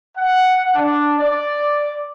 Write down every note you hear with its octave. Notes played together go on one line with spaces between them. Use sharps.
F#5
D4
D5